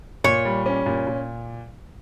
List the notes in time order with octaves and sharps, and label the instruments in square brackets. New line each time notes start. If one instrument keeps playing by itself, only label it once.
[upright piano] A#2 [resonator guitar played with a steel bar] C#5
[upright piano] G3
C#4
A#2
A#2